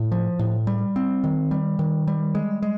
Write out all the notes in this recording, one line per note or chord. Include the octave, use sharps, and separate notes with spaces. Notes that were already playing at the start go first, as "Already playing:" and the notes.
Already playing: A2
F3
A2
G3
C4
D#3
G3
D#3
G3
G#3
G#3